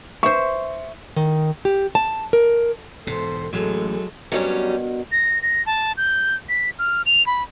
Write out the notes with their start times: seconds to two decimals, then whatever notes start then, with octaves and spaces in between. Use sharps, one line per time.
0.23 C5 E5 C#6
1.16 D#3
1.65 G4
1.95 A5
2.33 A#4
3.07 E1 G#2 B2 A4 C5
3.53 A1 A2 F#3 G#3 A4
4.32 G2 B2 F#3 G3 C#4 A#4
5.12 A#6
5.42 A#6
5.66 A5
5.97 G6
6.49 B6
6.79 F6
7.06 F7
7.27 B5